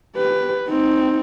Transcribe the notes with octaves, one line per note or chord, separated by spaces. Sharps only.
G4 B4
C4 D#4